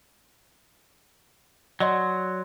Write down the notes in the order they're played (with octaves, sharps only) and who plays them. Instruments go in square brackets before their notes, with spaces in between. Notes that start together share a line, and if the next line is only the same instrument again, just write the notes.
[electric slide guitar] F#3 [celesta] D5 D#5 C6